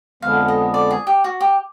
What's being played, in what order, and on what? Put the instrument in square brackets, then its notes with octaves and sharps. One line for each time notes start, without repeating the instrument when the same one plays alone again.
[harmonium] F2 D3 F3 G#3 B3 [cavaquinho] F5
[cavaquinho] D#5
D5
G#4
G4
F#4
G4